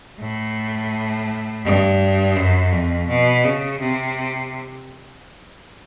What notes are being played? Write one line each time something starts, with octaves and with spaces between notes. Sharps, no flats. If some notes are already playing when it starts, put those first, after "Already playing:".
A2
G2
F#2
F2
B2
C#3
C3